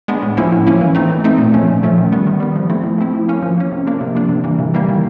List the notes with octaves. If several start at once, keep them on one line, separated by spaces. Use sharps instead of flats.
G#3 B3 D4
A2
F3 A#3 C#4 E4
A2
F3 A#3 C#4 E4
E3
A3 C4 D#4
E3
A3 C4 D#4
A#2
F3 A3 C#4
A#2
F3 A3 C#4
D#3
G3 B3
D#3
G3 B3
F3
A3 C4 E4
F3
A3 C4 E4
F3
A#3 C#4
F3
A#3 C#4
C3
F3 A#3 D4
C3
F3 A#3 D4
C3
E3 G3 A#3
C3
E3 G3 A#3
D#3